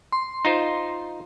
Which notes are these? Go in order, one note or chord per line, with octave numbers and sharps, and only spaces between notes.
C6
D#4 F4 C5